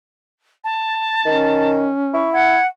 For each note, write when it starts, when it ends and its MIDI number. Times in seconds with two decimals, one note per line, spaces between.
0.64 1.72 81
1.25 1.88 51
1.25 2.32 61
2.14 2.56 64
2.14 2.32 85
2.33 2.66 78
2.33 2.61 92